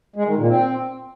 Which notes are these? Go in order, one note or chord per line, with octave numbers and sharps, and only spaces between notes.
G#3
D#3
A#2
C4